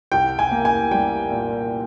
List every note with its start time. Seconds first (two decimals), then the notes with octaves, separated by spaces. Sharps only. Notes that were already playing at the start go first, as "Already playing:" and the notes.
0.12 C2 G5
0.39 G#5
0.51 A#3
0.65 G#5
0.91 G3 G5
1.31 A#2